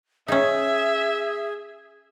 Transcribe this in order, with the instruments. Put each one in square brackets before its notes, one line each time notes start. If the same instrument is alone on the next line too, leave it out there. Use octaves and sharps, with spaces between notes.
[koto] C#4 D#4 [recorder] G#4 [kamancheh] E5